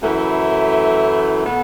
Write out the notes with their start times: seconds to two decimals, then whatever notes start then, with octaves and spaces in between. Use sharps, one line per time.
0.01 F#2 E3 A3 E4
1.45 B2 B3 F#4 A4